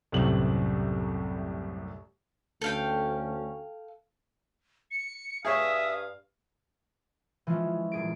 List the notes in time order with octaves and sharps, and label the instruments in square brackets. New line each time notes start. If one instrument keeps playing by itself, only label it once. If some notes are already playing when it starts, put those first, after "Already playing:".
[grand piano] C2 F#2 A2 C3 F#7
[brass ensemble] D2 C#4 [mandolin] A4 F5 G5
[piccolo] C#7
[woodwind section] G2 F5 [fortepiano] G#4 C#5 [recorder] E5 [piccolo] D#6
[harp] E3 F3 G#3 C#4 F4
D#1 G#4 D7